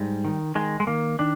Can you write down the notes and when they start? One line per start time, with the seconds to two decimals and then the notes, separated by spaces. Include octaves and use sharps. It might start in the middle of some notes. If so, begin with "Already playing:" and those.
Already playing: G#2 G3
0.25 D#3
0.55 D#3 G#3
0.80 G#3
0.87 D#3 A#3
1.19 D#3 D4